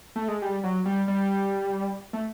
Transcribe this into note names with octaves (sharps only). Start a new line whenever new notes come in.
A3
G#3
G3
F#3
G3
G3
A3